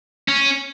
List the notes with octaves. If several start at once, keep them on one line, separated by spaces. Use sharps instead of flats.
C#4